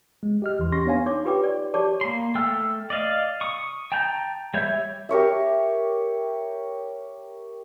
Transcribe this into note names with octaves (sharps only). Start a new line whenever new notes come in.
G#3
G4 D#5 F6
E2 E3 C6
C#4 G4 C6 C#6 A#6
B3 D4 C#5 F5 G#5
D#4 C#5 D6
F4 G4 B4 G5 D6
D5
G4 C#5 D5 A5 D6
A#3 C6
A3 G5 E6 F6
D5 D#5 F5
C#6 D#6
G5 A5 A#5 G6
G3 C#5 E5 G6
G4 A#4 C#5 E5